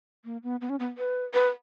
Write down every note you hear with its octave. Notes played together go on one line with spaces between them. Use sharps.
A#3
B3
B3
C#4
B3
B4
B4